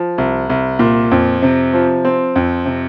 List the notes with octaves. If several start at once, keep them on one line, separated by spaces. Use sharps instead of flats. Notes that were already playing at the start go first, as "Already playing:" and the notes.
Already playing: F3
C2
C2
A#2
F2
C3
F3
C4
F2
C3